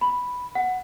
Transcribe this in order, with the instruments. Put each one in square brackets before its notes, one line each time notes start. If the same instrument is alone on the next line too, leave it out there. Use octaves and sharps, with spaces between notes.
[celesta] B5
F#5